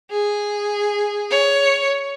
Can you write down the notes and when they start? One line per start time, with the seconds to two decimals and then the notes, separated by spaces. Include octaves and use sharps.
0.11 G#4
1.31 C#5